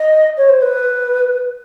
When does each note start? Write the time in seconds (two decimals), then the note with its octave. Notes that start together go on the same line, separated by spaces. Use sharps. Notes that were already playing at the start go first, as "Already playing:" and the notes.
Already playing: D#5
0.37 C#5
0.49 C5
0.62 B4